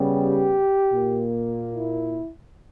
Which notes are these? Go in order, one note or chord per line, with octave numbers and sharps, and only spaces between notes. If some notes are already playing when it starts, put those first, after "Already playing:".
Already playing: C#3 G3 B3
G4
A#2 A#3
E4